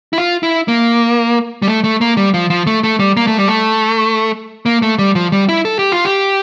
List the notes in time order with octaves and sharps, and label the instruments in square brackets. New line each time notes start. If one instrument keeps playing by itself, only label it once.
[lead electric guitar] E4
F4
E4
A#3
G3
A3
A3
A#3
G3
F3
F3
A3
A3
G3
A#3
A3
G3
A3
A#3
A3
G3
F3
G3
E4
A4
G4
F4
G4